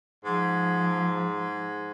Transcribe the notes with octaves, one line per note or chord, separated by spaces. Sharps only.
G#2 F3